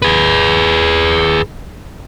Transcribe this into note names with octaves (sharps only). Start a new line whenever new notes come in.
G#4 B4